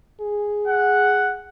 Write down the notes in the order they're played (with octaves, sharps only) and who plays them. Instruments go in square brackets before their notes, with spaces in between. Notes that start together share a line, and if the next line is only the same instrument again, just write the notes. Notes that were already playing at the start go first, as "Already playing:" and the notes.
[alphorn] G#4
[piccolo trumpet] F#5